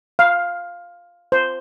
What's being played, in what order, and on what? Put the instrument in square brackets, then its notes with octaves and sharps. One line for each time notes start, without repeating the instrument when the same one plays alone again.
[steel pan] F5
C5